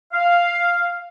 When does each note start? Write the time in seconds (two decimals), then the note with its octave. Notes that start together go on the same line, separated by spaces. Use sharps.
0.13 F5